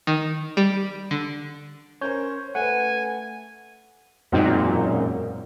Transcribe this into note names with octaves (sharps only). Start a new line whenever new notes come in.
D#3
G3
D3
C#4 A#4 C5 C#5 G6
A3 B4 F#5 G#5
E1 F#2 A#2 C4 D#4